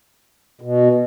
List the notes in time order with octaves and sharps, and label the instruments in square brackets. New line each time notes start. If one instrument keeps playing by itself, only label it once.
[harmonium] B2